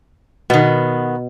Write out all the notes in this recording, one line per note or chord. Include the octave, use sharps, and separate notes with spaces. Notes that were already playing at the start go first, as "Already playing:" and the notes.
B2 D#3 B3